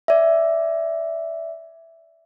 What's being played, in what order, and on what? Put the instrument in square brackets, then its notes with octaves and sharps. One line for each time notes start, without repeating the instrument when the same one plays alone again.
[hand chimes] D5 E5